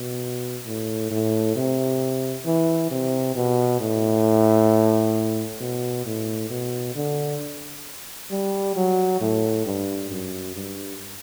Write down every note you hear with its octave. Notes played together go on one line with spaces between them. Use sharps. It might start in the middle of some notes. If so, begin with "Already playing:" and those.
Already playing: B2
A2
A2
C3
E3
C3
B2
A2
B2
A2
B2
D3
G3
F#3
A2
G2
F#2
G2